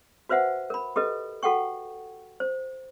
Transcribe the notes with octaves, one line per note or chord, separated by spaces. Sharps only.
F#4 B4 C5 E5 F#5
A#4 B5
G4 A4 B4 D#5
F#4 A4 F#5 G5 C#6
C5